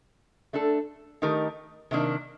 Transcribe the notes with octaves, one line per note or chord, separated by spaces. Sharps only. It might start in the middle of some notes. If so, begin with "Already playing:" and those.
A3 D4 A4
D#3 A3 D#4 G4 A#4
C3 D#3 A#3 D4